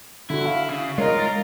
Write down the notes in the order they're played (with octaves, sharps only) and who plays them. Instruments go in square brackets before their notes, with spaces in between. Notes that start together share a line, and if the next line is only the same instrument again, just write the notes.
[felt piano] D3 F#4 [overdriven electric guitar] E4
[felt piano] F5
[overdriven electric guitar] C#3
[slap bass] G#3 [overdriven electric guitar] F4 [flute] A#4 [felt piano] C#5 D#5
[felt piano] A6